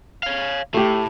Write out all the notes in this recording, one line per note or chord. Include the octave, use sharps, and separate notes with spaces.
C#5 F5
A2 A3 G4